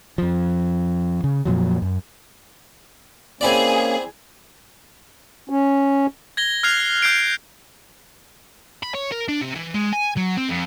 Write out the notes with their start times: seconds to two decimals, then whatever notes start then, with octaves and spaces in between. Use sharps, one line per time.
0.18 F2 F3
1.24 C#3
1.45 F2 A#2 F3 F#3
1.82 F#2
3.41 A#3 C4 C#4 E4 G#4 D5
5.50 C#4
6.37 G#6 A#6 G7
6.63 F6 F#6 G#6 C7 F7
7.02 F6 G6 C7 D7
8.83 B5
8.95 C#5
9.12 A#4
9.29 D4
9.41 C3
9.56 E3
9.74 G#3
9.93 G#5
10.17 F#3
10.37 C4
10.49 F2